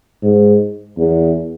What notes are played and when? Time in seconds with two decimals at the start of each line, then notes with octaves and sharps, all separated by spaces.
0.23 G#2
0.98 E2